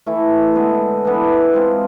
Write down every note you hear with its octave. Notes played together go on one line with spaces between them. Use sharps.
E3 A3 E4
D3 G#3 B3
E3 B3 D4 A4
G#3 C4 F4 G#4